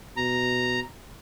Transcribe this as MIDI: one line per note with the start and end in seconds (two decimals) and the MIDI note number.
0.17 0.79 47
0.17 0.80 82